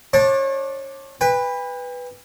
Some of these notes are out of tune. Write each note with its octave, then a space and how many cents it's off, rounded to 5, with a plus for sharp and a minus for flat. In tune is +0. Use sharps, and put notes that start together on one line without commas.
D4 +0 C#5 -35 A5 +10
B4 +0 G5 +45